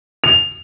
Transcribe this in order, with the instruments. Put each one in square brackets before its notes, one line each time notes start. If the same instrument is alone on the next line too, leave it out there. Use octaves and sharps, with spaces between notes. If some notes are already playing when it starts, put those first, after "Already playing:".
[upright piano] F7